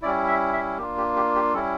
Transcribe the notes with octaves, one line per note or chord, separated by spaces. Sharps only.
G3 C#4 E4 D5
E5
E5
A#3 D4 F4 G4
G4
G4
G4
G3 C#4 E4 A4